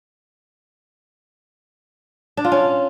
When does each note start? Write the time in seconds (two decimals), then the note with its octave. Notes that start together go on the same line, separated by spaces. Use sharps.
2.37 D4
2.45 F4
2.52 C#4